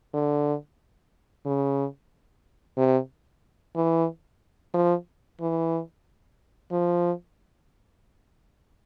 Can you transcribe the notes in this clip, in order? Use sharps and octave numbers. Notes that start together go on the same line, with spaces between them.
D3
C#3
C3
E3
F3
E3
F3